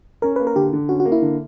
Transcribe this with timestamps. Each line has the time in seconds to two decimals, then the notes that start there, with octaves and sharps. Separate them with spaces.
0.22 C#4 A#4
0.36 A#3 B4
0.47 A#4
0.55 D3 G4
0.73 D3
0.89 C#4 F#4
1.00 F#4
1.05 A#3
1.12 E4
1.22 D3